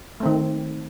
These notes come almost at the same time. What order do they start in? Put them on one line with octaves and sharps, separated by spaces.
A3 C4 D#3